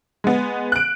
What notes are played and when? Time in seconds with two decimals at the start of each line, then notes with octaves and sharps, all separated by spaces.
0.24 G#3 B3
0.72 F#6 D7